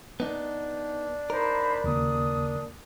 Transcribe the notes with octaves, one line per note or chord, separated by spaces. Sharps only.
B3 D4 D#4
D#4 A#4 C5 B5
D#2 C#3 A#3 D#6